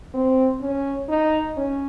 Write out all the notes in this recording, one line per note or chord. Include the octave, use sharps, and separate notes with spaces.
C4
C#4
D#4
C#4